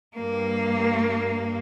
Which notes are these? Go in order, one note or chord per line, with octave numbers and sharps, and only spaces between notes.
G2 A#3